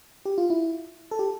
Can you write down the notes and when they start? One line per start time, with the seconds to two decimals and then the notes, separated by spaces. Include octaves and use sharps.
0.25 G4
0.38 F4
0.50 E4
1.11 A4
1.19 G4